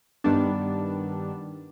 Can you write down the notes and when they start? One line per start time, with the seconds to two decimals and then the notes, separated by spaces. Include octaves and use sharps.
0.24 G2 D#3 G3 B3 D4